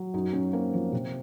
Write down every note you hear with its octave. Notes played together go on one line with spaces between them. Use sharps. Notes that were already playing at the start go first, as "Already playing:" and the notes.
Already playing: F#3
F#2 D#4
F#2 C#4
A#3 C4
F3
C3